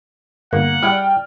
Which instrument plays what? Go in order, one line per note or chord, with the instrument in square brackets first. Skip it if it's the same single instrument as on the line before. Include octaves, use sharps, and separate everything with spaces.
[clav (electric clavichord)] G1 [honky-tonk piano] A#3 [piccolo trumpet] F#5
[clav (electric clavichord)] G3 E4 G#4 [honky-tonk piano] D5 G5 F6